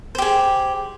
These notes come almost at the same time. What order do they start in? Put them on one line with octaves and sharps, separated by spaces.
C5 G4 G#4